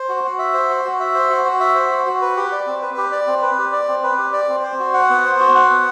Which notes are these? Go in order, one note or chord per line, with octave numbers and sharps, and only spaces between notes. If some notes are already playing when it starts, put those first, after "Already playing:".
Already playing: C5
F#4
F#4
E5
C5
F#4
F#4
E5
C5
F#4
F#4
E5
C5
F#4
F#4
B4
G4
D5
C4
B4
G4
D5
C4
B4
G4
D5
C4
B4
G4
D5
C4
C5
F#4
F#5
B3
C5
F#4
F#5
B3